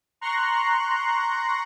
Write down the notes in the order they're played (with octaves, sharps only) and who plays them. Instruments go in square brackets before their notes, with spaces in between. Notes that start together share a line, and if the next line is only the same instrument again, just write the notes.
[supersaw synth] A#5 C6 C#6 F#6